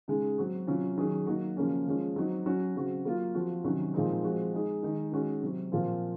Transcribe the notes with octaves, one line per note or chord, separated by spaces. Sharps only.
C#3 G#3 D#4 G#4
F#3 C4 F#4
C3 F#3 C#4 F4
D#3 F#3 C#4 G#4
F#3 A#3 D#4 F#4
C#3 F3 A#3 C#4 F#4
F3 G#3 C#4
F#3 C4 D#4 F#4
F#3 C#4 F#4
C#3 F#3 C4 F#4
F#3 A#3 F4
F3 C4 F#4
C3 D#3 F#3 C#4 F#4
A#2 F3 G#3 C4 D#4
F3 G#3 C4 F#4
G#3 D#4 G#4
D#3 G#3 D#4 G#4
D#3 G#3 C#4 F#4
C3 F#3 C4
A#2 F3 C4 F4